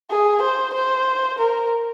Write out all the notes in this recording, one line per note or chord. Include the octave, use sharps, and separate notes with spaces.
G#4
C5
C5
A#4